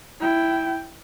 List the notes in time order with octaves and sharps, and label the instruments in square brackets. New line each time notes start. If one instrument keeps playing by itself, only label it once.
[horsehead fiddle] E4 G5